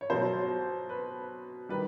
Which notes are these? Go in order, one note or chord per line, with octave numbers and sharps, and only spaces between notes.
C#5
B2 F#3 C5
B4
D#3 G3 B4